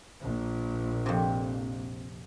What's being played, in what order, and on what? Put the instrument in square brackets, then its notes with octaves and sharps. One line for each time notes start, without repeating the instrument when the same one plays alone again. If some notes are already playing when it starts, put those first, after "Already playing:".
[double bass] A#1 A#2
[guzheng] F2 C3